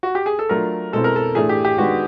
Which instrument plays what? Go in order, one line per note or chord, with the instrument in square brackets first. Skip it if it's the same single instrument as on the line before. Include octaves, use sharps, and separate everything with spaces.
[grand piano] F#4
G4
G#4
A4
[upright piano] F#3 A3 D4 F4 [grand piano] A#4
[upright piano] B2 G#3 C4 E4 [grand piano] A4
[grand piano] A#4
A4
[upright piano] A2 E3 A3 D4 [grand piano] G#4
[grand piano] G4
G4
[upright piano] D#3 G#3 B3 D4 [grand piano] F#4